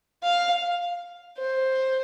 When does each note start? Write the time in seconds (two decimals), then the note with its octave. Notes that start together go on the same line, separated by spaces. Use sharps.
0.23 F5
1.38 C5